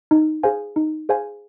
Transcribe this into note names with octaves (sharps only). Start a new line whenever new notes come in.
D#4
G#4 C5 F5 G#5
D#4
G#4 C5 F5 G#5